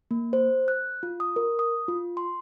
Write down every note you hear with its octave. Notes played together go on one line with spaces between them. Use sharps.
A#3
C5
F#6
F4
D#6
A#4
D#6
F4
C6